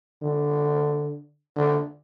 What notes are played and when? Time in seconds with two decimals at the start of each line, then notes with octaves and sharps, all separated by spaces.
0.22 D3
1.56 D3